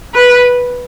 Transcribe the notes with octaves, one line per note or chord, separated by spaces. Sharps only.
B4